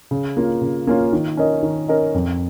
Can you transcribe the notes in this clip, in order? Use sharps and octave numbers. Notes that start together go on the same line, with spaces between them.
C#3
A#3 C#4 F4
C#3
A#3 C#4 F4
D#3
C#4 A#4 D#5
D#3
C#4 A#4 D#5
F2